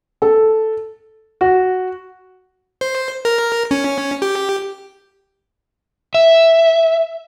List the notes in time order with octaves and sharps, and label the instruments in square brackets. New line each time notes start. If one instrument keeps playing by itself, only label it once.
[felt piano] A4
[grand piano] F#4
[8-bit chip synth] C5
A#4
C#4
G4
[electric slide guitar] E5